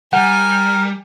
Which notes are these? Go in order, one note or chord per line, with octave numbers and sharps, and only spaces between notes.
G3 A#4 F#5 G#5